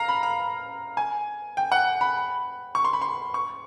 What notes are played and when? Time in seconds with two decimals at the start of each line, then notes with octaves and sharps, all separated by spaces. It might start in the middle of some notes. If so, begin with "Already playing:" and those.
Already playing: F5 A#5
0.08 B5
0.23 A#5
0.97 G#5
1.57 G5
1.72 F#5
2.01 B5
2.75 C#6
2.85 C6
2.93 B5
3.02 C6
3.34 C#6